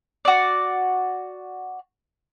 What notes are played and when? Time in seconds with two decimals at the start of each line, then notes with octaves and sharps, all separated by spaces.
0.25 F#4 D5